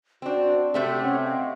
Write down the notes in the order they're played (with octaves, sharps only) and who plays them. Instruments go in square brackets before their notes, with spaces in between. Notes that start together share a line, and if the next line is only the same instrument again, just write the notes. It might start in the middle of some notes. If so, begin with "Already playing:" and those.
[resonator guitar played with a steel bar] C4 D4 [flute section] F#4 C5 D5
[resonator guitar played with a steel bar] C3 A3 C4 [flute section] G4 D5
[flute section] C#4 F#5
D#5 F5 G5